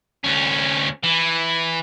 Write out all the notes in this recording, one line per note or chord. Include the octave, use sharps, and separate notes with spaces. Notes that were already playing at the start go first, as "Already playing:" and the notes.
D2 C#4
E3